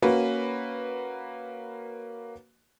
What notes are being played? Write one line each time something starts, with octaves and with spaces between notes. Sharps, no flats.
A#3 C#4 F#4 B4